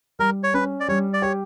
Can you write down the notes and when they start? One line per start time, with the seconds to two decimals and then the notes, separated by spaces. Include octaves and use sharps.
0.19 G3 A#4
0.43 C#5
0.54 C#4 B4
0.80 D5
0.88 G3 C#5
1.13 D5
1.22 G4 C#5